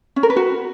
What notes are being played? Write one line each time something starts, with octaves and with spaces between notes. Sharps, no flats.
C#4
A#4
B4
F#4